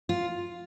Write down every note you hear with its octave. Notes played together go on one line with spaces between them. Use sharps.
F4